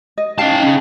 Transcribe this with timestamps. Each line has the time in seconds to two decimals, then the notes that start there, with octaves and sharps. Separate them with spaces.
0.18 D#5
0.38 C#4 D#4 F5 G5 A5
0.63 C#4 G#4